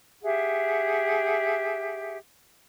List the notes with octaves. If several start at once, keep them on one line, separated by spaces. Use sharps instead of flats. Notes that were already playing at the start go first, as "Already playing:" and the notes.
G4 G#4 E5 F#5